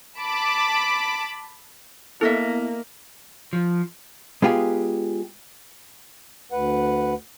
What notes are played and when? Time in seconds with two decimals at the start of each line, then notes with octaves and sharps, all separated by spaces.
0.19 A5 B5 D6
2.21 A#3 B3 E4 A4 D#5 E5
3.53 F3
4.42 G#3 B3 F4 G4 G#4
6.52 D2 B4 F#5